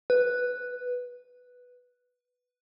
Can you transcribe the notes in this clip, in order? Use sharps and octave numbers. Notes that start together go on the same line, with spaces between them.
B4